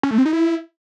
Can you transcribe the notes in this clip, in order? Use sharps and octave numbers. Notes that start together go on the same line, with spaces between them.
C#4
A3
C4
D#4
E4